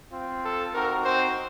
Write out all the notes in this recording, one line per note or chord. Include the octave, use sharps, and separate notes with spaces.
C4 F4
A4
C4 D#4 F#4 A#4
C4 C5